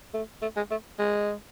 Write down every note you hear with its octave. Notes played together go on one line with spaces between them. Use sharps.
A3
A3
G#3
A3
G#3